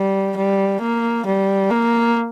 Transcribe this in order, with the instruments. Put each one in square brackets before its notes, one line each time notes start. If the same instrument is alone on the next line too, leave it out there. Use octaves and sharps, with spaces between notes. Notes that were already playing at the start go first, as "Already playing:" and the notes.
Already playing: [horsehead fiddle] G3
G3
A#3
G3
A#3